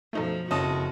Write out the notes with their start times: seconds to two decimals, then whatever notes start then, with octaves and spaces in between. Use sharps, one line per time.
0.13 F#2 B2 F3 A3 D#4 A4
0.51 F#1 F2 C#4 F#4 D#5 A5 D#6